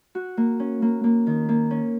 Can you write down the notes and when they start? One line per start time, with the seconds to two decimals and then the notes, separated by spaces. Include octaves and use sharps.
0.15 F#4
0.37 A#3
0.60 C#4
0.82 A#3
1.04 A#3
1.27 D#3
1.49 A#3
1.71 C#4